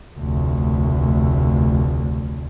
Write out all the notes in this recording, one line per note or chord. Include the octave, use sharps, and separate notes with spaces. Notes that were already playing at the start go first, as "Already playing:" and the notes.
F1 D2